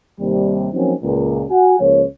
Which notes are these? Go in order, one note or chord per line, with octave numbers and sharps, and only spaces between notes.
D#2 C3 G3
F3 F#3 A#3 C4 C#4 D#4
C#2 A#2
F#4 F#5 G#5
C#2 F3 A#3 C#5